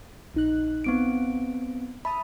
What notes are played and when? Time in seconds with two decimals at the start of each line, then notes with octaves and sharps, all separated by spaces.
0.34 A#1 D#4 F#6
0.84 B3 C4 D7
2.05 E5 A5 B5 D#6